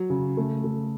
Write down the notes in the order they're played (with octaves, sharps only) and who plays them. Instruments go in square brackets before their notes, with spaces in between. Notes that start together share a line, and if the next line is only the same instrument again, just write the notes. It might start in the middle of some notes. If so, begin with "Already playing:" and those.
Already playing: [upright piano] F#3
C#3
A3
A3